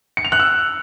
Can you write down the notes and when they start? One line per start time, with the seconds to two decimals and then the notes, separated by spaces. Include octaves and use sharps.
0.17 C#7
0.25 F7
0.32 F#6
0.40 E6